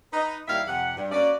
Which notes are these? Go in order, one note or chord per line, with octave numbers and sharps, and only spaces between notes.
D#4 B4
D#2 D#3 G3 E4 E5 F5
F2 C3 G4 F#5
G2
A#3 C#4 F#4 D5